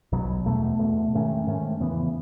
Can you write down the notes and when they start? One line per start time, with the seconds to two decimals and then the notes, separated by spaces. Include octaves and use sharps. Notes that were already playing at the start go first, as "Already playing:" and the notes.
0.12 B1 B2 F#3
0.46 E2 B2 A3
0.79 E2 B2 A3
1.13 G#2 D#3 A3 C#4
1.47 G#2 D#3 A3 C#4
1.80 E2 C#3 E3 B3